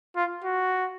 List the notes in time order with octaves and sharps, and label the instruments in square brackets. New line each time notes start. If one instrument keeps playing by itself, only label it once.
[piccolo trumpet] F4
F#4